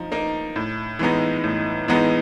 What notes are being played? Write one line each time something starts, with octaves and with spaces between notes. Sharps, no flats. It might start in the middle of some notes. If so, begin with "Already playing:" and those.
Already playing: F3 D#4
A#3 D#4
A2
E3 G#3 B3 D#4
A2
E3 G#3 B3 D#4